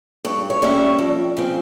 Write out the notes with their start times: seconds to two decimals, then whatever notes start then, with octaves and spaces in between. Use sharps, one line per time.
0.25 G2 C#5
0.50 C#5
0.62 G3 A#3 C#4 E5
0.99 F2
1.37 C#3 F3 C4